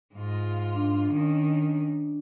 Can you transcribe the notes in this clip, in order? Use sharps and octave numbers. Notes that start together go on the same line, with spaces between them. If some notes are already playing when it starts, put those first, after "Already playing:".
G#2 F4
D4
D#3 C#4